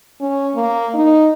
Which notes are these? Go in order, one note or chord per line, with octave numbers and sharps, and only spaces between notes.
C#4
A#3
D#4